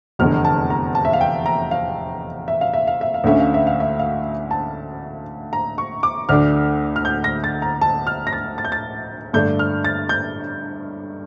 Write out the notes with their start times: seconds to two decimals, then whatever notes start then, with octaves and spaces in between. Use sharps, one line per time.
0.19 F1 E2 D3 F6
0.45 A5
0.70 A#5
0.95 A5
1.05 E5
1.13 F5
1.21 G5
1.46 A#5
1.71 F5
2.48 E5
2.61 F5
2.74 E5
2.87 F5
3.01 E5
3.14 F5
3.24 D2 D3 A3 C#4 E5
3.40 F5
3.54 E5
3.67 F5
3.80 E5
4.00 F5
4.51 A5
5.53 A#5
5.78 C#6
6.03 D6
6.29 D2 D3 A3 D4 F6
6.96 F6
7.05 G6
7.24 A#6
7.44 A6
7.62 A#5
7.81 A5
8.07 F6
8.27 A#6
8.33 A6
8.58 A6
8.65 G6
8.72 A6
9.33 G2 D3 A3 D4 G6
9.59 F6
9.84 A6
10.09 G6